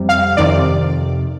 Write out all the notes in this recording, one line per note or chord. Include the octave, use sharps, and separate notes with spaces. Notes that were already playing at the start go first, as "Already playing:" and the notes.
Already playing: F2 C3 G3
F5
F2 C3 D#3 D5